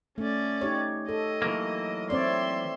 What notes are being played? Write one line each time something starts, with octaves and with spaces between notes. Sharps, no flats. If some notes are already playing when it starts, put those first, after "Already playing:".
A3 C#4 D5
D#4 G4 C#5
A4 D#5
E3 F#3 A#3
C4 C#5 D5 E5 C6